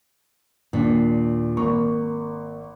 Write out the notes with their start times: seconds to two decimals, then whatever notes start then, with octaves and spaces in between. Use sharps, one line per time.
0.73 D#2 A#2 D4
1.57 G#1 A#3 C#6